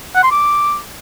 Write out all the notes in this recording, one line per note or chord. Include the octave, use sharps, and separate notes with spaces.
F#5
C6
D6